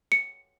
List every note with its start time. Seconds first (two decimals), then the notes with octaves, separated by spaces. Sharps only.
0.12 C#7